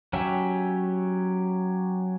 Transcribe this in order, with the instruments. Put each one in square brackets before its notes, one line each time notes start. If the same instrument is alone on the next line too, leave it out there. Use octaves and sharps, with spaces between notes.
[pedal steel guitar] F#3 C#4 G4 E5